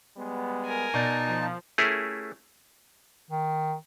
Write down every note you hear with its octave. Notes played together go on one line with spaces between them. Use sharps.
G3 G#3 B3
A#4 G#5
B2 D#4 D5 A5 G6
F3
A3 C#4 E4 G4 G#4 A#4
D#3